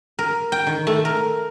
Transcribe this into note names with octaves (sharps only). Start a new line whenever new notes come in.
A#4
G5
D#3
A3
A#4